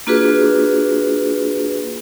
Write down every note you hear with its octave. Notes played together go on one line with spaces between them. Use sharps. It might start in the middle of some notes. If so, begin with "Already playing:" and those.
A#3 D4 F4 F#4 G#4 B4